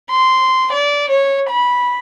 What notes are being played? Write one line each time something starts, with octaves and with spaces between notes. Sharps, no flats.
C6
D5
C#5
B5